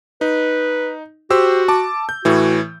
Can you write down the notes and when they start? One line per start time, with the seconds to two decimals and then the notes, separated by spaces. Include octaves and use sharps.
0.21 D#4 B4
1.30 F#4 G4 C5 E6
1.68 A5 D6
2.09 G6
2.25 A2 E3 F#4